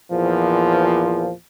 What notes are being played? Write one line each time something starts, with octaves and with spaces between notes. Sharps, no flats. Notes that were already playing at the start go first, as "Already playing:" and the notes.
E2 A#2 F3